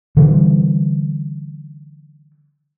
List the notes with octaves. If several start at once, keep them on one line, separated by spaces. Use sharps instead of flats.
D3 E3 G3